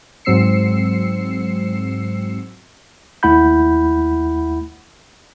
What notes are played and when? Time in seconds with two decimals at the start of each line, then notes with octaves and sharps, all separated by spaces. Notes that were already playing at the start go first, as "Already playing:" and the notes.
0.25 G#2 F#3 C4 E6 C7 C#7
3.23 D#2 A3 E4 F#5 B5 G6